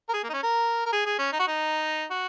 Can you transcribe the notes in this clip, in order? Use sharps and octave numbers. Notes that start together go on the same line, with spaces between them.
A#4
G#4
A#3
D#4
C#4
A#4
A#4
G#4
G#4
C#4
D#4
F#4
D#4
F#4